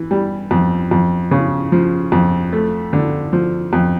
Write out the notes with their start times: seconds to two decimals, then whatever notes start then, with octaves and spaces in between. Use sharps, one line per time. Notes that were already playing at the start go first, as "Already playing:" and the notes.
Already playing: E3
0.11 G3
0.51 F2
0.91 F2
1.31 C#3
1.72 F3
2.12 F2
2.52 A3
2.93 D3
3.33 F3
3.73 F2